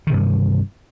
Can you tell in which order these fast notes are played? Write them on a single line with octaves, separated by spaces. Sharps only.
D#3 C3 G2